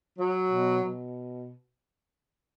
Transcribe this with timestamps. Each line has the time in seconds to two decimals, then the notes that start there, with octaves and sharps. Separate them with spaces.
0.19 F#3
0.51 B2
0.83 B2